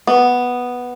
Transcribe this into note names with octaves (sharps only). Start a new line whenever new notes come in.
B3